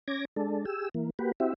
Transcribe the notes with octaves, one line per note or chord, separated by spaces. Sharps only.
C#4 D6 G#6 A#6
G#3 D4 A4
G4 G#4 E6
E3 A#3
A#3 F#4 G4 B4
C4 E4 F#4 G4 E5